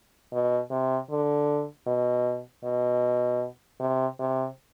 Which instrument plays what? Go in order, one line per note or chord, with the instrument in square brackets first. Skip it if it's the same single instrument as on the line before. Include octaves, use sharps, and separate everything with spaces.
[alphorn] B2
C3
D3
B2
B2
C3
C3